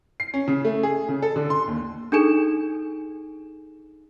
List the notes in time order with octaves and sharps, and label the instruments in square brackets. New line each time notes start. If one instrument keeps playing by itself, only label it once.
[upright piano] C7
C#4
C#3
A3
G#4
C#3
A4
D3
C6
D#2
[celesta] D4 D#4 G#4 A4 G#5 E7